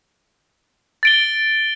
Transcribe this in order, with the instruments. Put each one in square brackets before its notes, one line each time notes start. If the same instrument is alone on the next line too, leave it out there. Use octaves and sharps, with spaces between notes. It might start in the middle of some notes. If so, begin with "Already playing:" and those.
[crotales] A6 D7 G7